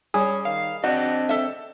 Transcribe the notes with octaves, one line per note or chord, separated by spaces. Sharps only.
G3 C#4 G#4
D#3 F5
C4 D4 F#4 D#5
A4 E5